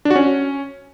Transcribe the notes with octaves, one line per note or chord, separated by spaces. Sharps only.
D4
F#4
C#4